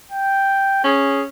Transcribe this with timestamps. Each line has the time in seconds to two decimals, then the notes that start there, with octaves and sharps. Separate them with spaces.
0.11 G5
0.84 C#4 G#4